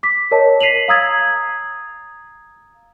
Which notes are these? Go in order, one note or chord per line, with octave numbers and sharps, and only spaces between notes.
D6 B6
A#4 C#5 D#5 A5
B6 C7 D#7 F7 F#7
F5 A#5 D#6 E6 G#6 A6